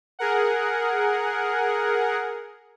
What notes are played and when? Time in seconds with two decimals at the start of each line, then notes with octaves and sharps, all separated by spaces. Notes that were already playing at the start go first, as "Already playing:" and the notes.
0.19 G#4 A#4 F#5